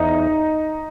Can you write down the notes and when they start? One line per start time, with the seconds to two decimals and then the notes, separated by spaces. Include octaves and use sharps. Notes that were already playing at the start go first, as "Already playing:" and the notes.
Already playing: E2 D#4